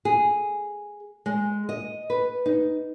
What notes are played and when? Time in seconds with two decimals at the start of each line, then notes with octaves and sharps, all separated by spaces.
0.05 G#4
1.26 G#3
1.69 D#5
2.10 B4
2.46 D#4